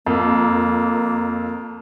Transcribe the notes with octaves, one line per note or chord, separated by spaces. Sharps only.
F2 A#3